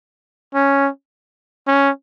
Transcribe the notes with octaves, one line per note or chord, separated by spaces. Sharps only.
C#4
C#4